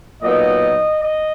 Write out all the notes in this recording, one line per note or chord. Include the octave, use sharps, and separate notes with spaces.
A#2 F#3 B3 D#4 D#5
D#5